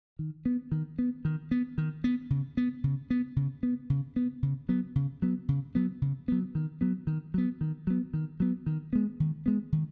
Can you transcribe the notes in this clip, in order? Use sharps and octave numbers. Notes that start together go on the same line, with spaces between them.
D#3
B3
D#3
B3
D#3
B3
D#3
B3
C#3
B3
C#3
B3
C#3
B3
C#3
B3
C#3
F#3 B3
C#3
F#3 B3
C#3
F#3 B3
C#3
F#3 B3
D#3
F#3 B3
D#3
F#3 B3
D#3
F#3 B3
D#3
F#3 B3
D#3
G#3 B3
D#3
G#3 B3
D#3